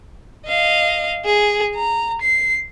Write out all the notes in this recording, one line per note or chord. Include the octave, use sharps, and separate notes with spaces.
D#5 F5
G#4
A#5
C7